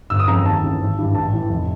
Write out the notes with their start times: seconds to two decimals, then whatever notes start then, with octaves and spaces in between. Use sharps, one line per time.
0.10 G1 E6
0.20 D#6
0.28 C#3 A#5
0.31 F2
0.46 D#2 A5
0.64 C#3 E3
0.80 G#1
0.98 G2 E3
1.15 A1 A5
1.32 A2 E3
1.49 F1